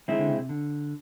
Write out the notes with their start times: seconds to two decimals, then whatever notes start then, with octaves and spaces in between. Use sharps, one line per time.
0.08 D#3 G#3 C4 E4
0.19 D3
0.28 C#3
0.39 C3
0.49 D3